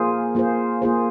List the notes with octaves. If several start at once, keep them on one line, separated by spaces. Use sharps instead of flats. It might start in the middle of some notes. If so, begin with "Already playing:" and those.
Already playing: A#3 F4 G#4 C5
A#3 F4 G#4 C5
A#3 F4 G#4 C5